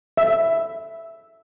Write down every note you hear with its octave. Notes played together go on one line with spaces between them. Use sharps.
E5